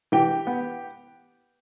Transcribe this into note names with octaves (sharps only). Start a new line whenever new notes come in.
E3 G4 G5
B3